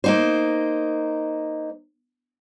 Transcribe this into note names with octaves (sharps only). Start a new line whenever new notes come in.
A#3 D#4 C5